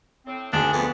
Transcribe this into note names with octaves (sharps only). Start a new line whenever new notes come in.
A2 C4
D2 D#3 D4 G#4
F2 B3